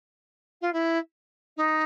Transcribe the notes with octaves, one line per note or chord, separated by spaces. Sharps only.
F4
E4
D#4